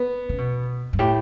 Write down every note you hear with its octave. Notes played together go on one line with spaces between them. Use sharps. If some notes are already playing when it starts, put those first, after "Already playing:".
Already playing: B3
C#3
B2
G2
A2 G4